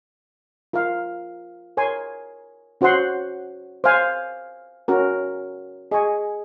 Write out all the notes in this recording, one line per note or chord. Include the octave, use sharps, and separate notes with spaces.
F4 A#4 F5
A#4 C#5 G#5 C6
C#4 F#4 C5 F#5 C6
C5 F5 G#5
C#4 F#4 A#4
G#4 D#5 G#5 C#6